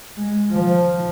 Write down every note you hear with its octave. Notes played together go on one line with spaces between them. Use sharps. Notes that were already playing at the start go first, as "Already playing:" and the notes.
G#3
F3